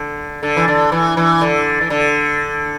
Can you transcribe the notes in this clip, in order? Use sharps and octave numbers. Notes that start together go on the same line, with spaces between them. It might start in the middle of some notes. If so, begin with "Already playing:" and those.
Already playing: D3
D3
E3
D3
E3
E3
D3
E3
D3